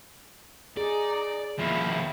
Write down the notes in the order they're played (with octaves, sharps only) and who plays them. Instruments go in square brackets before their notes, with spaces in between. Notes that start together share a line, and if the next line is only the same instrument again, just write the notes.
[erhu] D#4 [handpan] G#4 [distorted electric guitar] D5
[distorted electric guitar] D#2 [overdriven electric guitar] B2 F3 [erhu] E4